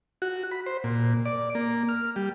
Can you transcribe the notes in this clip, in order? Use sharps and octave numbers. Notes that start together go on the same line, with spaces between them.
F#4
B5
C5
A#2
D5
A#3
F6
G3